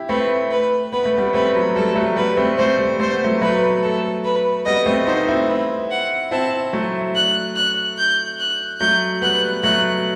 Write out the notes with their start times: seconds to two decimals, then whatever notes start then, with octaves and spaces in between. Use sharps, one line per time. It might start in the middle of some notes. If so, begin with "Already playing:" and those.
Already playing: E4 G4
0.09 A3 C4 B4
0.51 B4
0.93 B3 B4
1.05 A3
1.17 G3 B3
1.33 A3 C4 B4
1.55 F#3
1.76 G3 A4
1.95 F#3 A3
2.16 G3 B3 B4
2.37 A3 C4
2.58 A3 C4 C5
2.78 G3
3.00 A3 C5
3.12 B3
3.24 F#3 A3
3.41 F#3 A3 B4
3.82 A4
4.24 B4
4.65 G3 B3 D#5
4.86 A3 C4
5.07 B3 D#4 C5
5.27 C4 E4
5.48 B4
5.91 F#5
6.31 C4 E4 A5
6.73 F#3 A3
7.15 F#6
7.56 F#6
7.98 G6
8.39 F#6
8.80 F#3 A3 G6
9.22 G3 B3 F#6
9.63 F#3 A3 F#6